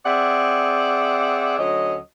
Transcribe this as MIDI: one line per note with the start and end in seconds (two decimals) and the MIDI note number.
0.05 1.55 60
0.05 1.55 68
0.05 1.55 74
0.05 1.55 76
0.05 1.55 78
1.58 1.97 38
1.58 1.97 54
1.58 1.97 61
1.58 1.97 75